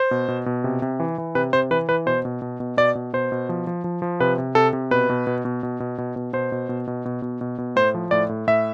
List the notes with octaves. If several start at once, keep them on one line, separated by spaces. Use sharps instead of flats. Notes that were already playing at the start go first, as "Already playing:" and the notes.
Already playing: C5
B2
B2
B2
C3
C3
E3
E3
C3 B4
C3 C5
E3 B4
E3 B4
B2 C5
B2
B2
B2
B2 D5
B2
B2 C5
B2
F3
F3
F3
F3
C3 B4
C3
C3 A4
C3
B2 B4
B2
B2
B2
B2
B2
B2
B2
B2 C5
B2
B2
B2
B2
B2
B2
B2
A2 C5
F3
A2 D5
A2
A2 E5